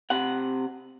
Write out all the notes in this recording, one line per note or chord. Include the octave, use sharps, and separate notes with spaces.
C3 F#5